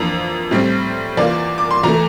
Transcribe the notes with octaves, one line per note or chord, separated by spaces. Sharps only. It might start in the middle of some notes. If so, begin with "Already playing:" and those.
Already playing: F2 E3 A#3 D4 A#5
A2 G3 C4
E2 E3 A#3 F4 D5
D6
C6
E2 E3 A3 A#5